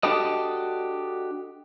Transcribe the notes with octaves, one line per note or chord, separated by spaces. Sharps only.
D4 F#4 G4 A4 D#5